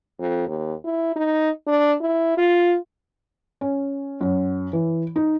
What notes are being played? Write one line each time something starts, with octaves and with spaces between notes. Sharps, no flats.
F2
D#2
E4
D#4
D4
E4
F4
C#4
F#2
E3
D#4